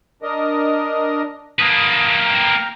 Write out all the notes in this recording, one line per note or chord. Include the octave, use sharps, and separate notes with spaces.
D4 A#4 D#5
A#3 B4 A5 D#6
G5 A#5 F6